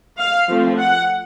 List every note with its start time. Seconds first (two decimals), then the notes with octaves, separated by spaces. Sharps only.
0.18 F5
0.47 F3 A3 C4
0.77 F#5